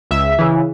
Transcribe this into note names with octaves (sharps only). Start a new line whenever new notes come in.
C#2 E5
C#3 E3